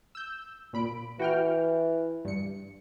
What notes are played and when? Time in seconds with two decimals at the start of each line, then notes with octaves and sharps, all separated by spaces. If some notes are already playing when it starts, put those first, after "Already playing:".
0.15 E6 G6
0.73 A#2 B5 D7
1.19 E3 F#4 G5 F6
2.25 G2 C#7